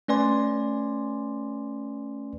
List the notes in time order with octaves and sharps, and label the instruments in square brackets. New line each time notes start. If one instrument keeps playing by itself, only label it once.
[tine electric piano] A3 C#4 B4 D5 G#5 C6